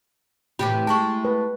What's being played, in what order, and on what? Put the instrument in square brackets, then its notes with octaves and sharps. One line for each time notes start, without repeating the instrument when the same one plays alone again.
[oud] A2 C3 E3 [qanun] G4 [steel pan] B5
[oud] G#3 A3 E4 [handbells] A5 C#6
[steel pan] B4